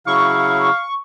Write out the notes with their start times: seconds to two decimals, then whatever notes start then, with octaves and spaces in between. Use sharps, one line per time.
0.07 C#3 F#3 E4 F5 C#6